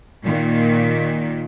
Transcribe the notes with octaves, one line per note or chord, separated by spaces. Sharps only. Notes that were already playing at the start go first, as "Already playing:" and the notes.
A#2 D#3